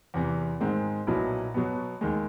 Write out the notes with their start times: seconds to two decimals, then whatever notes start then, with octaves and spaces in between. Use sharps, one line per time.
0.14 E2 C3 E3
0.61 G#2 D#3 G#3 C4
1.07 B1 A#2 F#3 B3 E4
1.54 B2 F#3 B3
2.01 D#2 D#3 G#3